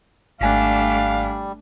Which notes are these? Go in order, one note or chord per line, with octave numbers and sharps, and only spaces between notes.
G#1 G3 A3 D4 F5 G#5 F#6